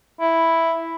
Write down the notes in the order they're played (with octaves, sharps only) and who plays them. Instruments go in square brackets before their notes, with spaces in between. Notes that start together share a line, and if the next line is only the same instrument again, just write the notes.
[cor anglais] E4